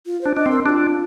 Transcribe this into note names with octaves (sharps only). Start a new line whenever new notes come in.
F4
D4 C5
D4 D#5
C4
A#4
D4 F4 G4